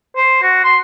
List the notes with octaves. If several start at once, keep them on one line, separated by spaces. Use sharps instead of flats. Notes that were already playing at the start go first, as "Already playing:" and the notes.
C5
F#4
C6